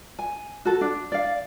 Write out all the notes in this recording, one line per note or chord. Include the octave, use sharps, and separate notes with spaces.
G#5
F#4 A4
D4
D5 F5